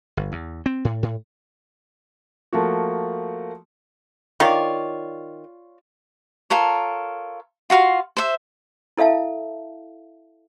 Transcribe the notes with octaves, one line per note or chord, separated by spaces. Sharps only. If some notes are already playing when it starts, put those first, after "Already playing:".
G1
E2
C4
A2
A2
F3 A3 A#3 F#4
D#3 F4 C#5 D5
F4 A4 A#4 C#5
F4 F#4 F5 C6
C5 E5
E4 A4 E5 F5 A5